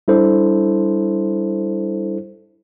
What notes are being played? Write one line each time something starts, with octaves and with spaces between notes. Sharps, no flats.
G3 D4 E4 A4 C5